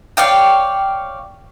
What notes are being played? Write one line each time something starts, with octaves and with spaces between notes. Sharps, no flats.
C#5 D5 F5 G5